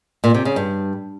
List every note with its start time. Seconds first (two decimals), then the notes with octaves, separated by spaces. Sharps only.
0.24 A#2
0.35 C3
0.45 C#3
0.56 G2